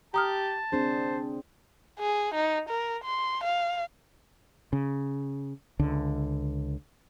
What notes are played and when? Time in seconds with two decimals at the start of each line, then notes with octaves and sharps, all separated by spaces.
0.14 G4 A5 A#5 D#6 F6
0.72 C4 D4 G#4 C5
2.00 G#4
2.34 D#4
2.69 A#4
3.04 C6
3.44 F5
4.73 C#3
5.79 C#2 D3